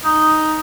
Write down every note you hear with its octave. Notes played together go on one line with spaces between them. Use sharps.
D#4